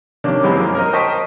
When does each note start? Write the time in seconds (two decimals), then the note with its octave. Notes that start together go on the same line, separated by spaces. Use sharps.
0.24 C3 D#3 A#3 C#4 D4
0.43 G2 E3 G#3 B3 C4
0.55 F#2 A#3
0.75 A#4 C5 D#5
0.93 C5 D#5 G5 A5 C#6 B6